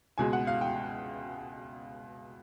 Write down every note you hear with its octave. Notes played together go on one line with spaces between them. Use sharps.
C#2 B2 G#3 G#5
F#5
F5
G5